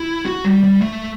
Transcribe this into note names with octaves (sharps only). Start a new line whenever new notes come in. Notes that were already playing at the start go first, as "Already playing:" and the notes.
Already playing: E4
F#4
G3
G3
A3